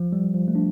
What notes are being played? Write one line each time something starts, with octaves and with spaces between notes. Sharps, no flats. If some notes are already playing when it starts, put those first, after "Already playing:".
Already playing: F3
G3
F3
A3
D4